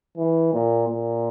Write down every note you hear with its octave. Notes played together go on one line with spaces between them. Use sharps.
E3
A#2
A#2